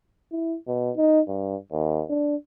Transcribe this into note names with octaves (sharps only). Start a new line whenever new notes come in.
E4
B2
D#4
G2
D#2
D4